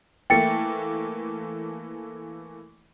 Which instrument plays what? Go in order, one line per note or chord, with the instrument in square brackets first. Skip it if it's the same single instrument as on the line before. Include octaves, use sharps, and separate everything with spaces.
[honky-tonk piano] E3 A3 A#3 [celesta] G5 A6 C#7